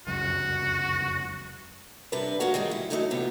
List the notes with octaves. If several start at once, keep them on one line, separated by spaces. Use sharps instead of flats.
F1 C#2 F#2 F#4
G2 C3 D4 A#4 B4
F3 F#4 A#4 C#5 F5
D#3 G3 G#3 F4
E4
C#3 E3 F#3 A3 D#4 A4
C3 B3 F4 F#4